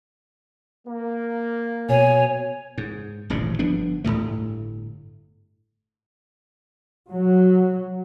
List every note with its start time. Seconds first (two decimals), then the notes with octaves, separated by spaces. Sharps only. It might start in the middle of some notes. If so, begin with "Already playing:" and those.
0.86 A#3
1.89 B2 C#5 G#5
2.78 G#2
3.30 D#1 A1 G#2 C#3
3.59 G1 F3 B3 D4
4.04 G1 D#2 A2 A3
7.09 F#3